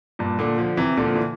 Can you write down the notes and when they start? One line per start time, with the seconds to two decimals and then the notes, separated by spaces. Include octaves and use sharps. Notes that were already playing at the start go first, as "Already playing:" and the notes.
0.19 G2 A#2
0.39 A#2 D3
0.58 D3 F3
0.77 C3 E3
0.97 A#2 D3
1.06 F3
1.15 E3